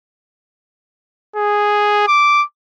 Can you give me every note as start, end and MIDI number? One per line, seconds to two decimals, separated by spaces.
1.36 2.08 68
2.08 2.43 86